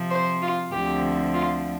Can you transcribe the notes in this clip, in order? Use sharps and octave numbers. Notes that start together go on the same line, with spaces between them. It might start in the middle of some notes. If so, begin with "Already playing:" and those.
Already playing: C3 F3 C4
C5
F4
D2 D3 F3 C4 G4
F4